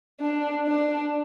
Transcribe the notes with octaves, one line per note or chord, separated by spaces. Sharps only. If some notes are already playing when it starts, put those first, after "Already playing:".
D4
D4